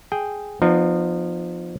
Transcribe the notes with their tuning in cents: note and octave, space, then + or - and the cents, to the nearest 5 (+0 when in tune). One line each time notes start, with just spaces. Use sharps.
G#4 +0 G5 +0
F3 +0 B3 +0 D#4 -40